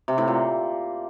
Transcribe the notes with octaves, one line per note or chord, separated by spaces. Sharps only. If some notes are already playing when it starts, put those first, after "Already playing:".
C3
A2
A#2